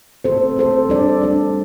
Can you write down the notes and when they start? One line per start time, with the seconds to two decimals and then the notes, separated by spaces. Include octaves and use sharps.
0.24 C4 A4 C5
0.57 C4 A4 C5
0.89 G3 D4 A4 D5
1.20 G3 D4 A4 D5